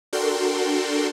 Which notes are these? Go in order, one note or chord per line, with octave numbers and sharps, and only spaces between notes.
D4 F#4 A4 A#4 G5 C6